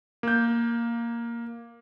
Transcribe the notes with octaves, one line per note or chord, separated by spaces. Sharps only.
A#3 G6